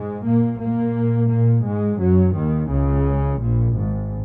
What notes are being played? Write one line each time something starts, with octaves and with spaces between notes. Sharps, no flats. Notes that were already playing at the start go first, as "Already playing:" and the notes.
Already playing: G#2 G#3
A#2 A#3
A#2 A#3
A#2 A#3
G#2 G#3
F#2 F#3
D#2 D#3
C#2 C#3
A#1 A#2
G#1 G#2